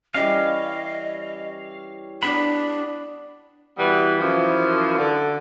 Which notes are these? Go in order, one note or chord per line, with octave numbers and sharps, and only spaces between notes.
E3 G3 C#4 D#5 F5
B3 D4 D5 B5
B2 E3 G3 B3 B4
F#2 E3 F3
D3